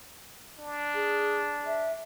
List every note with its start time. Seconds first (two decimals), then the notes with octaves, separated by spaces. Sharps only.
0.59 D4
0.94 G#4
1.66 E5